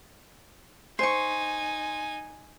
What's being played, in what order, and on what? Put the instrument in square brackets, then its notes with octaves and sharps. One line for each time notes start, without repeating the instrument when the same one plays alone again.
[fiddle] D#4 G#5 [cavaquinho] C5 C#6